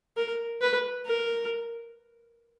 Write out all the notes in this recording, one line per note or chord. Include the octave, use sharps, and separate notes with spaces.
A#4
B4
A#4